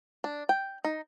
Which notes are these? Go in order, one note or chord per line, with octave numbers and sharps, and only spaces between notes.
D4
G5
D#4